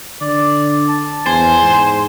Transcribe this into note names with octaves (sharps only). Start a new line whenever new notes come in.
D3 D5
A5
E2 C5 G#5
G#2